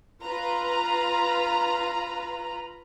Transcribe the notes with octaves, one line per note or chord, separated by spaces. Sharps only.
F4 B4 A#5